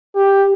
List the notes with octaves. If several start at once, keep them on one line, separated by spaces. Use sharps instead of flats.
G4